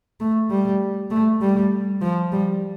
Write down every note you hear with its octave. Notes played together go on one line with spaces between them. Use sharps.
A3
G3
A3
G3
F3
G3